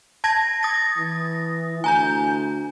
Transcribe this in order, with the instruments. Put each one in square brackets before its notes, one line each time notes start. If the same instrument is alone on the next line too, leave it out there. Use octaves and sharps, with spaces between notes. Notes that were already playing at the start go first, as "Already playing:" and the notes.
[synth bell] A5 G#6 A#6
D#6 A6 A#6
[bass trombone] E3
[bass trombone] D2 [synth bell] G#5 A#5 G6